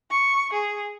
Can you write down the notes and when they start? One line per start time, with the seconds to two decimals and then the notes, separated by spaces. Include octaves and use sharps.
0.10 C#6
0.53 G#4